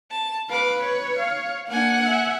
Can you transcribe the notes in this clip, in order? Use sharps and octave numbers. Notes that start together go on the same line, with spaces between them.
A5
B4 F5 D6
C#5
F5
A#3 D4 F#5 G#5
E5